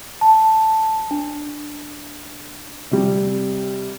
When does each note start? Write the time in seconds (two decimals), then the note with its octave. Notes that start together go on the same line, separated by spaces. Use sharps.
0.21 A5
1.11 D4
2.91 C3 G3